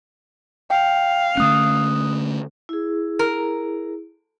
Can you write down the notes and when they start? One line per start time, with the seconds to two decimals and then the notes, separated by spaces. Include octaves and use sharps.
0.70 F5 G5
1.37 D3 A3 C#4 D#6 F#6
2.69 E4 G#4
3.19 A#4